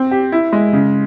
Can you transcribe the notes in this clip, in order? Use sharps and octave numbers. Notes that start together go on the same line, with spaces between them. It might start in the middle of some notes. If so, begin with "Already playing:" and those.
Already playing: C4
G4
E4
G#3
C#3